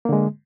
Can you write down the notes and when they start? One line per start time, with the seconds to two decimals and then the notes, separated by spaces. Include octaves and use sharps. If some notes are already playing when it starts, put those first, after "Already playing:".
0.05 A#3
0.09 D3
0.13 G#3